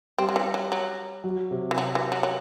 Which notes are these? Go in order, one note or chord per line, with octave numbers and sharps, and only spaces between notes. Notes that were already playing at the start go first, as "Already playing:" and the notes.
G3 C4
F#3
E3
F#3
F#3
F#3
C3
E3
F#3
E3
F#3
F#3